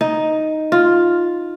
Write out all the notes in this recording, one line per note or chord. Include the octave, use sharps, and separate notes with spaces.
D#4
F4